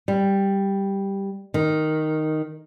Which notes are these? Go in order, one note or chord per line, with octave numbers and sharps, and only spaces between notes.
G3
D#3